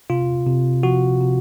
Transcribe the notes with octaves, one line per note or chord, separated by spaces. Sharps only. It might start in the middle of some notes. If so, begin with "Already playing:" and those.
C3 F4
C3
F3 F#4
C3